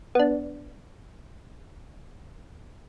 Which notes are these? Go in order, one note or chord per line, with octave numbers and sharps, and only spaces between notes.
B3 D4